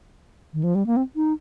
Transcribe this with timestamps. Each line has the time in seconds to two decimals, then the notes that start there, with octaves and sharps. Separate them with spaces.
0.54 D#3
0.63 F3
0.75 G3
0.87 A#3
0.97 C4
1.16 D#4